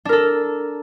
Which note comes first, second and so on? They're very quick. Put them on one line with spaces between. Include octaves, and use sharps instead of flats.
D4 A#4 A4